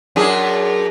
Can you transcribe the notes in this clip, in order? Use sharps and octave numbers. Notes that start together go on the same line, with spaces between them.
F#2 D4 G#4